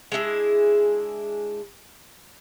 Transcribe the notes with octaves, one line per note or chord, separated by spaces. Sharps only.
G#3 D4 E4 G#4